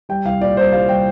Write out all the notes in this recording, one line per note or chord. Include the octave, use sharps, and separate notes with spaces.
G3 G5
C2 F5
A#2 D5
C2 C5
G3 F5
G3 G5